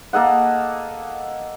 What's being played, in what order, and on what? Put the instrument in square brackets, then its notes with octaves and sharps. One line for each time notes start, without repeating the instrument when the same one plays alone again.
[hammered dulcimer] A#3 A4 D#5 F#5